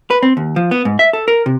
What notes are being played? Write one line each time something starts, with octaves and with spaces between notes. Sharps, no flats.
B4
C4
D#2
F3
B3
G#2
E5
A4
A#4
C3